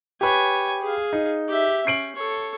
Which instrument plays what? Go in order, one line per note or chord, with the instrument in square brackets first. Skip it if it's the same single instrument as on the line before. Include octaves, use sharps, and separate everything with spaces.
[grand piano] G4 B4 [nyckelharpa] C#5 G#5
[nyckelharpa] G#4 F5
[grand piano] D#4
[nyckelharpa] G4 E5
[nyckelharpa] C#4 [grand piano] C7 D7 F#7
[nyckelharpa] A4 C#5